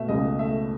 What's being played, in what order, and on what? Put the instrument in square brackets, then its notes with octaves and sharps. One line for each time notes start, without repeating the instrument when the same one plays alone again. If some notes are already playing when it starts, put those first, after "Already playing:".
Already playing: [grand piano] B2 A3 [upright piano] E5
[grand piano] C#2 [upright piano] D#5
[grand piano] A3 [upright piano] E5